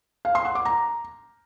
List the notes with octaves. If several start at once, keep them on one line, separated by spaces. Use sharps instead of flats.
F5
C6
F#5
D6
A#5